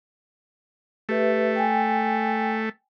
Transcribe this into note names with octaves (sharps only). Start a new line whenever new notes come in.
A3 G4 B4 E5
G5 G#5